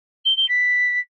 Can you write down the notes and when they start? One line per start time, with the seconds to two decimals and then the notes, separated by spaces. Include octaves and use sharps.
0.25 G7
0.36 G7
0.48 B6